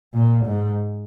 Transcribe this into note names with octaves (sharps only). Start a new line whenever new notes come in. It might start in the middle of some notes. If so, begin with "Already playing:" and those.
A#2
G#2